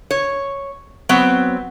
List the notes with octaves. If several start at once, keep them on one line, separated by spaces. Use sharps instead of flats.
C#5
F#3 B3 C4